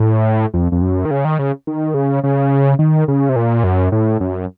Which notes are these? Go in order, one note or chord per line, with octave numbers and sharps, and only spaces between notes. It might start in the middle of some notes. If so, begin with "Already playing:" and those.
Already playing: A2
F2
F2
F#2
D#3
C#3
D#3
C#3
D#3
C#3
C#3
D#3
C#3
C3
A#2
F#2
A2
F#2